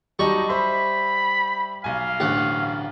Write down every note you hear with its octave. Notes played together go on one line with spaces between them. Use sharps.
F#3 G3 D#4 A5 C#6
C5 E5 B5
B1 F5 G#5
A1 D2 F#5